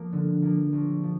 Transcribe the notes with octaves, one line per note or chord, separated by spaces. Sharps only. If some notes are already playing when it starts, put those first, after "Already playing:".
Already playing: F3 A#3
D3
F3 A#3
A#1
F3